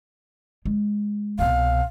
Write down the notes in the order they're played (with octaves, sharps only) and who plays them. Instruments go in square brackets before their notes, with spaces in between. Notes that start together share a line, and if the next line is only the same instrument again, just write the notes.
[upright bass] G#3
[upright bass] C2 B2 [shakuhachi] F5